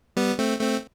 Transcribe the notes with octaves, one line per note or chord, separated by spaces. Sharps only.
G3 B3
A3 C4
A3 C4